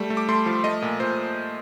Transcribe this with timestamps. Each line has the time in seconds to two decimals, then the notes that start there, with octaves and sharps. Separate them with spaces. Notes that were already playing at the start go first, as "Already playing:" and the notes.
Already playing: G3 A3
0.10 A3
0.17 D6
0.29 A3 C6
0.46 F3
0.64 A3 D#5
0.82 A#2
1.00 A#2 C5